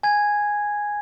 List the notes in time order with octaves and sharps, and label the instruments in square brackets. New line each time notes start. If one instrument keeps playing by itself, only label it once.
[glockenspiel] G#5 G#6